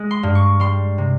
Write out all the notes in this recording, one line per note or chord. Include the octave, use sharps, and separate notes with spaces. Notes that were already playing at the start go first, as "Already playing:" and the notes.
Already playing: G#3
C6
G2
C#6
G3 C6
C3